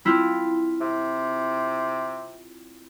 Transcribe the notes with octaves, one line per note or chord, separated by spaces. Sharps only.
C4 E4 F4
C3